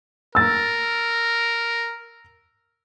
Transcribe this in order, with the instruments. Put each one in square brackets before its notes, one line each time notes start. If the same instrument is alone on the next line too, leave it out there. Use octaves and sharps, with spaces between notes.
[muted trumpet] A#4 [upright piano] E6 A6